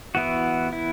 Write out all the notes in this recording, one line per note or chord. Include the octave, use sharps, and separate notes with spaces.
E3 B3 E4 F#4
E4